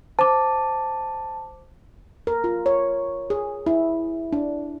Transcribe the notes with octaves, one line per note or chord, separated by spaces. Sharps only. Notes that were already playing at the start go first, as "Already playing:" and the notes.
C5 A5 D6
A#4
F4
C#5
G#4
E4
D4